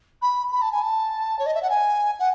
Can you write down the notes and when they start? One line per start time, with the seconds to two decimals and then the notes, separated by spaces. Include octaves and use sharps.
0.21 B5
0.52 B5
0.61 A5
0.71 G#5
0.82 A5
1.39 C#5
1.46 D#5
1.54 E5
1.62 F#5
1.69 G#5
2.19 F#5